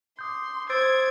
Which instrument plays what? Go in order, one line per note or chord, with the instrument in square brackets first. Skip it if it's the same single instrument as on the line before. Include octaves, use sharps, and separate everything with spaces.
[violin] C6 [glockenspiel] D6 D#6 G6
[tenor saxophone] C5 [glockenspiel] E6 A6 D7 [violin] G#6